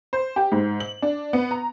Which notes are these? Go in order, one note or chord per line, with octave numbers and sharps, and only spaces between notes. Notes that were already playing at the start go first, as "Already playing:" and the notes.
C5
G4
G#2
F#7
D4
B3
A#5